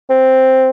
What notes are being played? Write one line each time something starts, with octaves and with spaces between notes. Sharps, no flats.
C4